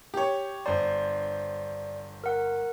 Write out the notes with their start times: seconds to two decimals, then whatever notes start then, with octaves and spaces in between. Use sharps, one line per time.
0.14 G4 C#5
0.66 G1 C5 D5
2.24 A#4 F#5